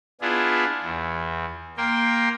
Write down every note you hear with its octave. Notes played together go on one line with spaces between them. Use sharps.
B3 D4 E4 F4 G#4
E2
A#3 A#4 G5 C6